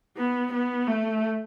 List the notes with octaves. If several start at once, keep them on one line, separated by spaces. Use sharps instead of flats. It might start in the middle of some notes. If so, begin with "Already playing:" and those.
B3
B3
A3